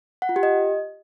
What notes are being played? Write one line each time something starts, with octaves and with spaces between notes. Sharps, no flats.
F#5
F4
G4
D#5